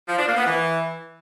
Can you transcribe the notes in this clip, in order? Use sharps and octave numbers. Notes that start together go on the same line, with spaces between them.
F3
D4
A#3
B3
E3